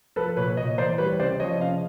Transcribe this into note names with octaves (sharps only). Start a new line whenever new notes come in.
F3 A4 B4
A#2 B4 C#5
A#2 C#5 D#5
E3 C5 D5
G3 B4 C#5
C#3 C5 D5
F3 C#5 D#5
C#3 D#5 F5